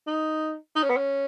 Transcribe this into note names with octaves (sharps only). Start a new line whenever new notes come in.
D#4
D#4
C#4
B3
C#4